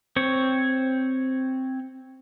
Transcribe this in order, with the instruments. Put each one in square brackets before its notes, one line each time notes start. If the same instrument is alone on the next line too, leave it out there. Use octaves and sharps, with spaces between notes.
[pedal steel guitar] C4 C#5